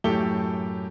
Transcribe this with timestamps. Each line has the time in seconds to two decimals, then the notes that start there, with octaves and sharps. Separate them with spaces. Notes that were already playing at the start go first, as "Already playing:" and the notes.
0.04 F#2 A2 G4 A4 G7